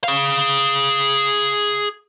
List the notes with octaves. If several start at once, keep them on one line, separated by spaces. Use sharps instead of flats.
G#4 F5